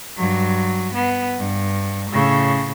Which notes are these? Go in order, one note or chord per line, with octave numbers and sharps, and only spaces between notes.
G2 F#3
B3
G2
A2 C#3